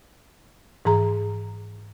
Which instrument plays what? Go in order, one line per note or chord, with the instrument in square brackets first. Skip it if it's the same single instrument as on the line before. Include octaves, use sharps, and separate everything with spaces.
[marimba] G#2 E3 G#4 A#5